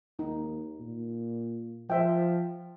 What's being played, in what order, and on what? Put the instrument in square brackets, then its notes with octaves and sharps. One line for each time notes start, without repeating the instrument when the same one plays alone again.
[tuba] D#2 [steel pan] D#4
[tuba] A#2
[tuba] F3 [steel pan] C5 E5 G5